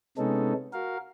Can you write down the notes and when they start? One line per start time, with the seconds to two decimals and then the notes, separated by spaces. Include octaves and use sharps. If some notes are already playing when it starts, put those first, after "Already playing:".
0.18 C3 G#3 B3 C#4 D#4 A4
0.73 F#4 A#4 F5